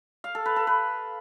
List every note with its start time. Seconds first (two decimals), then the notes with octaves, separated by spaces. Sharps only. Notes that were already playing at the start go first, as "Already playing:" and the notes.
0.24 F5
0.35 A4
0.46 B4
0.56 A4
0.67 B4